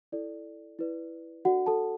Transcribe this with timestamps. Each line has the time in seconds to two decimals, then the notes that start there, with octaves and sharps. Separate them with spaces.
0.12 E4 A4 D5
0.79 E4 B4 D5
1.45 D4 F#4 A4 D5 F#5
1.66 A4 A5